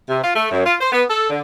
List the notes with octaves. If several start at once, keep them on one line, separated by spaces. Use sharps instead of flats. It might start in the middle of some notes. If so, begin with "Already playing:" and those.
C3
F4
A3
F#2
F4
C5
B3
A4
D3